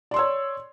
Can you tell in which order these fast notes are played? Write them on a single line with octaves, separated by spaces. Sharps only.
D5 C6 E6 C#5